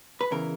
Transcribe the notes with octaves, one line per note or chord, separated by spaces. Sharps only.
B4
E2 C#3 E3 A#4